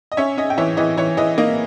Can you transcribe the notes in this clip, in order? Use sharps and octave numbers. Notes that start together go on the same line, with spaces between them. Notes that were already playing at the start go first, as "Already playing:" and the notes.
D#5
C#4 C#5 E5
C#4 D#5
G5
E3 C#5 E5
E3 D#5
E3 C#5
E3 D#5
A#3 D#5